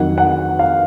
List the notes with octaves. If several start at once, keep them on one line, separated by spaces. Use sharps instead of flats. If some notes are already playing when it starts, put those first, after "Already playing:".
Already playing: F2 D#3 F#3 F#5
F#5
F5